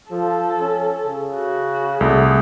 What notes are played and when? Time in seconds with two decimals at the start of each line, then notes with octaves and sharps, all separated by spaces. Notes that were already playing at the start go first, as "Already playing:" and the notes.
0.11 F3 A4
0.61 C#4
1.05 C#3
1.36 F#4
2.01 C2 A3 G#4